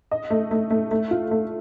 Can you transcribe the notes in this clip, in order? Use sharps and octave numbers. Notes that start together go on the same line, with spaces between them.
D#5
A3
A3
A3
A3
F4
A3